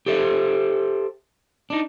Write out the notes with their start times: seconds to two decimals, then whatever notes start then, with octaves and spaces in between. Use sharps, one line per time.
0.06 G4 A4 C5 E5
1.70 D4 D#4